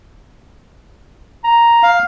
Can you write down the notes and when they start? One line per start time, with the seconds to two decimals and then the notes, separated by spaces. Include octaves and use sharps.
1.44 A#5
1.83 F5